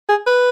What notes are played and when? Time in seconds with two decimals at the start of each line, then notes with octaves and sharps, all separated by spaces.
0.09 G#4
0.27 B4